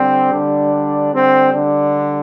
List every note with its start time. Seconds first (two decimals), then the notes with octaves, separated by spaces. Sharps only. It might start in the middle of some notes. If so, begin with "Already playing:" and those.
Already playing: D3 G3 C4
0.33 D3 D4
1.13 D3 G3 C4
1.54 D3 D4